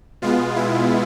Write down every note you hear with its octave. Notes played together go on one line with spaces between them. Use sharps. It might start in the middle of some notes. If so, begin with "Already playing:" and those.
B2 G#3 B3 F4
E4